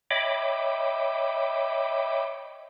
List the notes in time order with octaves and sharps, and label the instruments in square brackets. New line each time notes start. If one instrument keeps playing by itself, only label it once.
[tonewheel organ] C#5 D#5 E5 G5 B5 D6